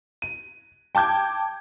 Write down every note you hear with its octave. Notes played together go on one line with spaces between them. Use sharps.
D#7
G5 A5 D6 G6 G#6